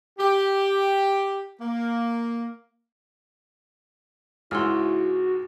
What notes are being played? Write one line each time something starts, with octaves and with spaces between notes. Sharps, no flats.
G4
A#3
C#2 G#2 E4 F#4 G#4 C6 E6 F6